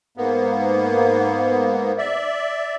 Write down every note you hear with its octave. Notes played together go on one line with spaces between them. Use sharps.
G#2 A#3 B3
D5 E5